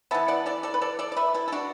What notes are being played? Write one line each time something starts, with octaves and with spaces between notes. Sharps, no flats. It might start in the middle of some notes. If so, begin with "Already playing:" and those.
E3 B3 E5 A5
D5 F#5
A4 D5
A4 D5
B4
A4 D5
A4 D5
D5
B4 E5
E4 A4
A4
D4 F#4